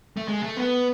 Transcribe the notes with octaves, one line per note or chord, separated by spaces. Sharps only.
A3
G#3
A3
B3